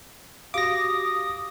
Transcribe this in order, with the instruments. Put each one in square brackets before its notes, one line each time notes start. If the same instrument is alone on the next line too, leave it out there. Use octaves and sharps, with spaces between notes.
[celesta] F#4 G4 F5 [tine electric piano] D6 A#6 [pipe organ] D#6